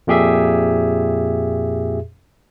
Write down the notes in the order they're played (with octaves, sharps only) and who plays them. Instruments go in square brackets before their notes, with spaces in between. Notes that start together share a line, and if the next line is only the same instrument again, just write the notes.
[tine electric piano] F2 A#2 G4 G#4 E5